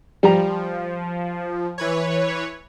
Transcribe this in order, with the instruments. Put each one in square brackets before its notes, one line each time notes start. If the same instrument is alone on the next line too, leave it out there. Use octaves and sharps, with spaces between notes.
[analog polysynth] F3 [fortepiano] G3 G4 A#5
[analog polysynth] E3 B4 C#5